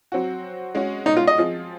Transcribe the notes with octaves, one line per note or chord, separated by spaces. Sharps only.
F#3 C4 F#4
G#3 C#4 F#4
D#4
F4
D#5
F3 C4 F4 G#4